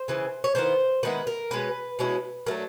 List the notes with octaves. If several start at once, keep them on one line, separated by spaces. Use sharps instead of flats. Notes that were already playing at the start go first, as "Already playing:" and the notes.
Already playing: C5
C#3 E3 G#3
C#5
D#3 G#3 B3 E4 C5
D#3 G#3 B3 E4 B4
A#4
B2 G#3 C#4 B4
B2 G#3 C#4 E4
F#3 A3 D4 A#4